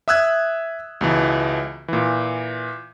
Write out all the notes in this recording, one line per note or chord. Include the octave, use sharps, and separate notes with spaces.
E5 D#6 E6 F#6 G#6
C#2 B2 E3
A#2 E3